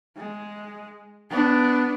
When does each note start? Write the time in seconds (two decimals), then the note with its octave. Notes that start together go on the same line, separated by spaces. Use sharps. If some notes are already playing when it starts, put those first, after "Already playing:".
0.17 G#3
1.30 B3 D4